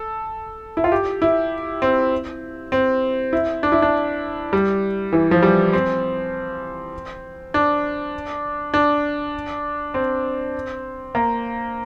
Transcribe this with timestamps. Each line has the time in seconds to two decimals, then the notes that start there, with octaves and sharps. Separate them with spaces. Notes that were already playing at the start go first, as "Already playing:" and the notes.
Already playing: A4
0.77 E4
0.84 F4
0.92 G4
1.22 E4
1.82 C4
2.72 C4
3.33 E4
3.63 D4
3.72 E4
3.82 D4
4.53 G3
5.13 E3
5.31 F3
5.42 G3
5.73 C4
7.54 D4
8.74 D4
9.94 C4
11.15 A#3